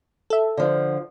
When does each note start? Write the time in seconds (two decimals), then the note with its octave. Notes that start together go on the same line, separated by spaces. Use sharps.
0.30 A4 E5
0.57 D3 F3